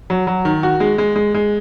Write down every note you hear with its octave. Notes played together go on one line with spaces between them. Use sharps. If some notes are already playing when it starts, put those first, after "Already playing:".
F#3
F#3
D#3
F#4
G#3
G#3
G#3
G#3